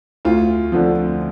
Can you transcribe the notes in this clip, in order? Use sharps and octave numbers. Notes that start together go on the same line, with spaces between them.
D2 F4
D3 F3